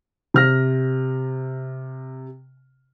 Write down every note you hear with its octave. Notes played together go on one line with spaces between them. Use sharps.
C3 F6 A#6